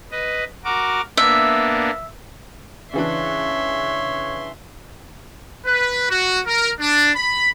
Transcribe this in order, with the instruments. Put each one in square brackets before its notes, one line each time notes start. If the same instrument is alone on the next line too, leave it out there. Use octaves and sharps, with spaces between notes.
[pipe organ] B4 D#5
F#4 A#4 D6
[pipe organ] A#3 B3 D4 [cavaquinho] E5
[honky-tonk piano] C#3 E3 D4 [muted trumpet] C#5 [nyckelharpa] E5 C6
[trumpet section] B4
F#4
A#4
D4
B5